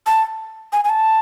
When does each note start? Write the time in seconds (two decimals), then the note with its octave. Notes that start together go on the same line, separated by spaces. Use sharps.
0.06 A5
0.73 G#5
0.85 G#5
0.89 A5